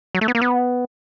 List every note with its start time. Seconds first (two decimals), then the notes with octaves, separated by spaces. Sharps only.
0.15 F#3
0.21 A3
0.28 B3
0.35 A#3
0.41 B3